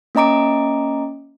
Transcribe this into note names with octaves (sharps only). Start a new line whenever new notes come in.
A#3 C#4 D#5 A#5 D6 D7